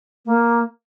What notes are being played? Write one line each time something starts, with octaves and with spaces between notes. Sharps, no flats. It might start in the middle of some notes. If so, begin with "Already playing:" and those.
A#3